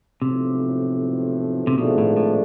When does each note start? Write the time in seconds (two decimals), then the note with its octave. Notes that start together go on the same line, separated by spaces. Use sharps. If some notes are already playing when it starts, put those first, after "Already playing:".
0.22 B1 A2 C3 F3
1.67 C3
1.78 G#1 G#2 B2 F3 A3 D4
1.98 A2
2.17 A2